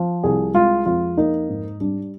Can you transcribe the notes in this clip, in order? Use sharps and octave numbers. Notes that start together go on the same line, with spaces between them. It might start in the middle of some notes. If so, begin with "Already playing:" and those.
Already playing: F3
C2 G#4
G#3 F4
F2 F4
A#3 D#4
G#2
G3 D4